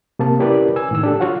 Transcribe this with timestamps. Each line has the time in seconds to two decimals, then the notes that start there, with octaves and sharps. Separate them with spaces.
0.19 C3 A#3 A5
0.39 C#4 E4 G4 A#4 B4 D5
0.76 G#5 E6
0.91 A2 D#3 E6
1.03 D4 G4 A4
1.20 F4 F#4 C#5 F5 F#5